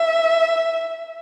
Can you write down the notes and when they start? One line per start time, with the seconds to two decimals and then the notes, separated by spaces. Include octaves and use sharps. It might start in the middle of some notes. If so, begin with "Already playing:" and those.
Already playing: E5